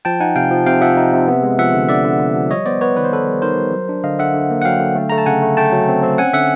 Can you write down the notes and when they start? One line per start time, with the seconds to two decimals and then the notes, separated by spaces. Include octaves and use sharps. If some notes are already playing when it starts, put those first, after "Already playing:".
0.05 F3 G5 A5
0.20 D#4 F#5 G#5
0.36 C3 F5 G5
0.51 F3
0.66 C3 F5 G5
0.81 F3 E5 F#5
0.97 D#4
1.13 C3
1.28 B3
1.43 G#3
1.58 F3 E5 F#5
1.74 D3
1.89 D3 D5 E5
2.05 D3
2.20 D3
2.35 F3
2.51 G3 C#5 D#5
2.66 B3 C5 D5
2.81 B3 B4 C#5
2.97 D#3 B4
3.04 C5
3.12 B3 A4 B4
3.27 G3
3.42 D#4 A#4 C5
3.57 G3
3.73 F#3
3.89 D4
4.03 D3 D#5 F5
4.19 D3 E5 F#5
4.34 D3
4.50 A#3
4.62 F#5
4.65 F#3 F5 G5
4.80 D3
4.95 A3
5.10 A3 A#5
5.18 A5
5.26 C#3 F#5 G#5
5.42 A3
5.57 A3 G5 A5
5.72 F#3
5.88 C4
6.03 C4
6.18 C#4 F#5 G#5
6.34 D3 E5 F#5